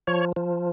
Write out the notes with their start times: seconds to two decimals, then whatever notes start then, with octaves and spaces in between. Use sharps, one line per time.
0.07 F3 C#5
0.36 F3